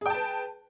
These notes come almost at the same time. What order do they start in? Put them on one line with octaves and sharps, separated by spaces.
G#4 G5 A5 B4